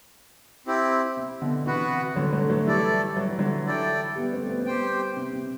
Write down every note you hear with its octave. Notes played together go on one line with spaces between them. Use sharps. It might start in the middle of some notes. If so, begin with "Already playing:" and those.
C4 E4 G4
C3
B2 D3
C3 E3 B3 F#4 B4 F#5
D3 F#3
F#3 A3
F#3 A3
E3 G3 A3 E4 A4 D5
F#3
E3
D3 F#3
E4 A4 D5 G5
G3 B3
A3 C4
B3
C4
G3 B3 G4 C5 G5
C3
C3